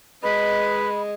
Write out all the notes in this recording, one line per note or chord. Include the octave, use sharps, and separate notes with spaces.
G#3 B4 D#5 B5